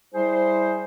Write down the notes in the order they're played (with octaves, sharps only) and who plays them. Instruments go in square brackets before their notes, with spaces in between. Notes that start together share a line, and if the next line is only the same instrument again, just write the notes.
[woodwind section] G3 E4 G#4 C5